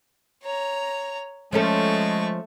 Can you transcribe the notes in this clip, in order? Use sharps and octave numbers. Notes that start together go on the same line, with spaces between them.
C#5 A#5
F3 G#3 A3 C#4 A4 C#6